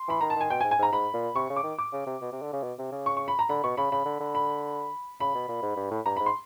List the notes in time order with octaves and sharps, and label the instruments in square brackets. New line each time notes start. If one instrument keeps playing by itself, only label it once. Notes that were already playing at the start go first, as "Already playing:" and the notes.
Already playing: [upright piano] C6
[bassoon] E3 [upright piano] B5
[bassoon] D#3 [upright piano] A#5
[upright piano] A5
[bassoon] D#3 [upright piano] G#5
[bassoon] B2 [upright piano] G5
[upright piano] G#5
[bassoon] G#2
[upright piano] G#5
[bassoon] G#2 [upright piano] A#5
[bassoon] G#2 [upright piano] B5
[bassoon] A#2
[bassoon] C3 [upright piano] C#6
[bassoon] C#3
[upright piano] D6
[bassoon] D#3
[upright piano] D6
[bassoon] C#3
C3
B2
C3
D3
C#3
B2
C3
C#3
[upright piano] C#6
C#6
B5
A#5
[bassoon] D3 [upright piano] B5
[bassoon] B2 [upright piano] C#6
[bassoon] C#3 [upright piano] B5
[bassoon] C#3 [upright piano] B5
[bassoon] D3
D3
[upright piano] B5
[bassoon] C#3 [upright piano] B5
[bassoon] B2
A#2
G#2
G2
A2
[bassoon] G2 [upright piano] A#5
[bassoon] G#2 [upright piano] B5
[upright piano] C6